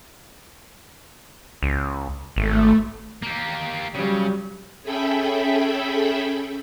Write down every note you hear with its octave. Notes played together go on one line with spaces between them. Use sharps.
C#2
G#1 A3
A#3 G4
C#3 F#3 G3
C#4 G#4 A4 E5 G5 B5